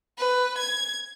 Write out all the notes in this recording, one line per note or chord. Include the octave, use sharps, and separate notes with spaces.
B4
G#6